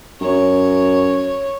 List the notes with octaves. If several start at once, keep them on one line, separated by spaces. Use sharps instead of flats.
F#2 C#5